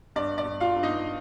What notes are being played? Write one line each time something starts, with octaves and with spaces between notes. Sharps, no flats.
G2 D5
D5
G2
F4 F5
G2
D#4 D#5